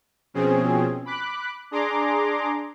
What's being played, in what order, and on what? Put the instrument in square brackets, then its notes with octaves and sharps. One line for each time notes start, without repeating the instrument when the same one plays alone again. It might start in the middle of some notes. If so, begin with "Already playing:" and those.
[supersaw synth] B2 F3 C4 C#4 G#4
B5 D6 F#6
D4 G#4 A#5 C6 D6